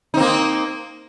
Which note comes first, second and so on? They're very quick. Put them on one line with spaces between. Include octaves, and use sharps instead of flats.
D#4 C4 A#3